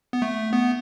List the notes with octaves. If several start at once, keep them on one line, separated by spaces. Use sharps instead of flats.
B3
A3
B3